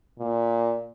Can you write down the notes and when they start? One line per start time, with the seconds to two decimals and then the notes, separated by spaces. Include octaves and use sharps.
0.19 A#2